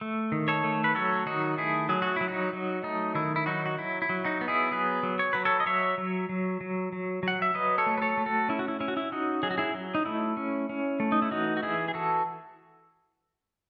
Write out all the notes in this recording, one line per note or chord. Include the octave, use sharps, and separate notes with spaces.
A3
D#3
A4 C#5
A3
B4
F#3 A4 C#5
D#3 D#4 F#4
A3 E4 G#4
F#3 G#4
F#4
F#3 E4
D#4 F#4
F#3
A3 D#4
D#3 E4
E4
F#3 D#4 F#4
F#4
F#3 E4
E4
F#3
D#4 F#4
B3
E4 G#4
F#3 G#4 B4
F#3
C#5
F#3 B4
A4 C#5
D#5
F#3 C#5 E5
F#3
F#3
F#3
F#3
F#3 F#5
E5
F#3 B4 D#5
A4 C#5
A3
B4
A4 C#5
A3
F#4 A4
C#4 E4
F#4
E4
C#4 E4
F#4
E4
C#4 D#4 F#4
F#3 G#4
F#4
E4 G#4
F#3
D#4
A3 E4
C#4
C#4
A3
D#4
E4
E3 D#4 F#4
F#4
E3 E4 G#4
G#4
E3 F#4 A4